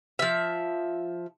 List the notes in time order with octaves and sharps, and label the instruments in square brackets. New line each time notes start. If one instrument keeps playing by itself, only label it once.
[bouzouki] F3 E5